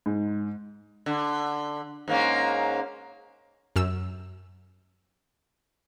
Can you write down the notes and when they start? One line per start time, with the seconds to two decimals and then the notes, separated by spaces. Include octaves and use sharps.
0.06 G#2
1.06 D3
2.08 G#2 A#3 C#4
3.76 F#2 E6